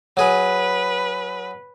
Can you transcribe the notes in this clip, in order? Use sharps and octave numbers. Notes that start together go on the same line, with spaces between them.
F#3 G#4 B4